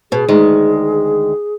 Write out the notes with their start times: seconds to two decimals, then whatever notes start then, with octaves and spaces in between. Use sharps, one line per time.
0.12 B2 G#4
0.28 D2 D#3 G#3